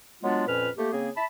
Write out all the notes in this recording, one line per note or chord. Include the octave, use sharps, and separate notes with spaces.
F#3 G#3 B3 D4 F4
F2 A#2 C#4 B4 F6
A3 A#3 G4
C#3 A#3 C4 G#4
E5 A5 B5